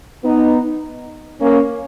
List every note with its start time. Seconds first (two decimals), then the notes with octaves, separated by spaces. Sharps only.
0.23 B3 D#4
1.41 A#3 C#4